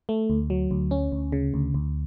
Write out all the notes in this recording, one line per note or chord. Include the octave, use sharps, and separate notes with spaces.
A3
D2
F#3
D2
C#4
D2
C#3
D2
D2